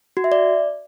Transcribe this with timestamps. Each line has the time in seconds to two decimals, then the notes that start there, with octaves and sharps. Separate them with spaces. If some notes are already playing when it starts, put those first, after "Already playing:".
0.17 F#4
0.24 E5
0.32 D5